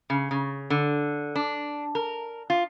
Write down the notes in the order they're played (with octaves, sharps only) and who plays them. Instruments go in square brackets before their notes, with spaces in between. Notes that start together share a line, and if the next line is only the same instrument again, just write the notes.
[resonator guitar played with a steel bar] C#3
C#3
D3
D4
A#4
F4